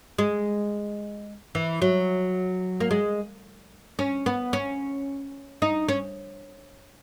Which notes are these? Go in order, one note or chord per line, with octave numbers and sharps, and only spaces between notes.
G#3
E3
F#3
A#3
G#3
C#4
B3
C#4
D#4
C#4